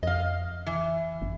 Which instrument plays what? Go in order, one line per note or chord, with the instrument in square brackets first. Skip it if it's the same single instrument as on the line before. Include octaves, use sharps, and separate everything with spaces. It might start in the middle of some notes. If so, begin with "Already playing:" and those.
[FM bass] F2 [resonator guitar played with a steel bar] D#5 F5
[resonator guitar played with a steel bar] E3
[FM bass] F#1